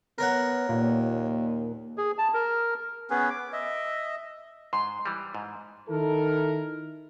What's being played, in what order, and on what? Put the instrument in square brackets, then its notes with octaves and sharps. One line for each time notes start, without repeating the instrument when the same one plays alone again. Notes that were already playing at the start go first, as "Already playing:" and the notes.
[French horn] B3 [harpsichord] A#4 C#5 F#5
[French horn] D#2 [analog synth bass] A#2
[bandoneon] G#4
A5
A#4
[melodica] B3 C#4 G#4 B4
D6
D#5 E5
[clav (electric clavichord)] G#2 [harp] C6
[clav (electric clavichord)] E3 G3
G#2
[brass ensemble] D#3 E4 A4 A#4